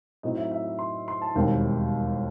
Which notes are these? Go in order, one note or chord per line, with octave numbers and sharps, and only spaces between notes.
A2 F#3 C4 D#4 D#5
E5
E5
E5
C6
C6
A5
E1 D#2 D#3 G3 C4 G5